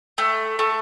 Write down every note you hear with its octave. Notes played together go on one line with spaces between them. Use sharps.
A3
A3